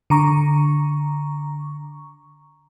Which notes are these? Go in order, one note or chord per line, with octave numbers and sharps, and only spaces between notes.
D3 A#5 C#6